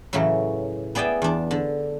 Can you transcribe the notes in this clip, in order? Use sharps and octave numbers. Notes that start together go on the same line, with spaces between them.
A2 C#3 E3 F#3
B3 G#4 D5 E5 G5
E2 D4
D3